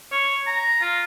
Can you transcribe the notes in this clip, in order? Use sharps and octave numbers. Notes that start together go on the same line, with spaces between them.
C#5
A#5
F4